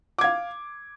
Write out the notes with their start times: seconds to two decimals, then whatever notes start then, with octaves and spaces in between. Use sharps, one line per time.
0.18 D6
0.21 G#6
0.24 F5